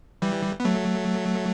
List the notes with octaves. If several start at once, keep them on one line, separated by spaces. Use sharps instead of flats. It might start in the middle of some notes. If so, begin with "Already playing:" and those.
E3 G3
B3
F#3 A3